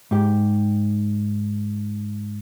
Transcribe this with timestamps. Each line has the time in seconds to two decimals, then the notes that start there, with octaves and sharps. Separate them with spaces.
0.11 G#2 G4